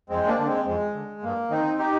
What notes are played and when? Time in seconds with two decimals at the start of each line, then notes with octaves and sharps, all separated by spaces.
0.10 F2 G#3 C4
0.28 A#3 D4
0.38 D3
0.46 G#3 C4
0.65 F2 G#3
0.93 D3
1.23 G2 A#3
1.50 D#3 C4 D#4
1.78 D#4 G4